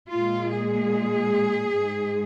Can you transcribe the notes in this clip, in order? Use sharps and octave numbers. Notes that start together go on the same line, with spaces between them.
A#2 G#3 F4
G#4
G#2 G#3